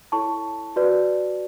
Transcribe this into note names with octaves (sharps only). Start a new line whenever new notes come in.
E4 A4 C#5 A5 C#6
F#4 B4 D5